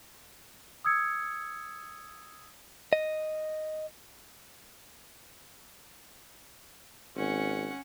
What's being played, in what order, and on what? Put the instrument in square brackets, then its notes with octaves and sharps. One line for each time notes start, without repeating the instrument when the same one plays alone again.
[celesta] D#6 E6 G#6 C#7
[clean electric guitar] D#5
[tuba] G#1 [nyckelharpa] C#4 F#5